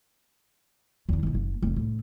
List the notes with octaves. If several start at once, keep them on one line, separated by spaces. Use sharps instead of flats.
E2 D#3
G#1 B2
F#1
F1
A2 D3